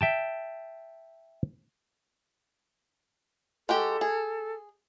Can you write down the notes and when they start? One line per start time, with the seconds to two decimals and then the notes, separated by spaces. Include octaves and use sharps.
0.01 E5 G5 A5
3.69 G#3 F#4 G4 A4
4.01 G#4